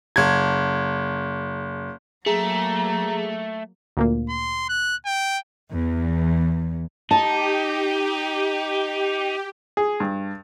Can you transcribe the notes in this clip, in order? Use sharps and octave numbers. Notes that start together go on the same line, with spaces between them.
F#1 G#6
F#3 A3 A#3 G#4 A#5
D2 A#2 A#3
C6
F#6
G5
E2
D#4 G4 A5
G#4
G2